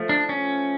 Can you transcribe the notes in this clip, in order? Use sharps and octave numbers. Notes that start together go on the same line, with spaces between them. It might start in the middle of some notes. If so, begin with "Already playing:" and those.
Already playing: F3 A3
D4
C#4